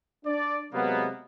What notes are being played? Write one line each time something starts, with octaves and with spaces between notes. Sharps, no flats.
D4 D5
C3 F#3 G#3 A#3 B3